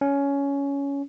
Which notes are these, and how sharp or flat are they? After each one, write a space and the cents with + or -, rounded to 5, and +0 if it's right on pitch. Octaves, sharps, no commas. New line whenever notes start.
C#4 +15